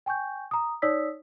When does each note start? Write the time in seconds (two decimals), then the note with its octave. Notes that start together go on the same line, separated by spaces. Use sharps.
0.06 G5 G#5 C#6 G6
0.51 A#5 D#6
0.82 D#4 C#5 D5 D#6 E6 B6